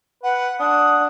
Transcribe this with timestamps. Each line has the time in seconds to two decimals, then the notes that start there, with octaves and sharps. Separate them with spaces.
0.23 B4 F#5
0.60 D4 F#5 D#6